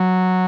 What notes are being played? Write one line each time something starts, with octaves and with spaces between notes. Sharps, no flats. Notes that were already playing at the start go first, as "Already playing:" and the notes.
Already playing: F#3